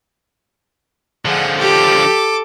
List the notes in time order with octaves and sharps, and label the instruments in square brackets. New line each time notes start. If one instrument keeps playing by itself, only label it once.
[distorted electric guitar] D3 F3 [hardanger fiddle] G#4 F#5
[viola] G4 [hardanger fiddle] A4 D6